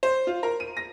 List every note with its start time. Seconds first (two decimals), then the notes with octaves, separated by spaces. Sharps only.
0.03 C5
0.27 F4
0.43 A#4
0.60 D#7
0.77 A#6